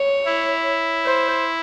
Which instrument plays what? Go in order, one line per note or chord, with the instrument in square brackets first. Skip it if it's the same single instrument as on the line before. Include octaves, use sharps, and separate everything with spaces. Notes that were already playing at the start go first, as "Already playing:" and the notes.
Already playing: [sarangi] C#5
[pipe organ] E4
[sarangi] C5